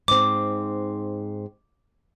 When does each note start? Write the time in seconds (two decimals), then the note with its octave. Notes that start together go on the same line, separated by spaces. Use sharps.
0.08 G#2 C4 D6